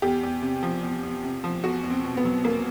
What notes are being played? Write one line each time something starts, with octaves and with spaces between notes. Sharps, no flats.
E2 G4
E2
C3
F3
E2
E2
C3
F3
E2 F#4
E2
C4
B2
B3
F#3
E2 A#3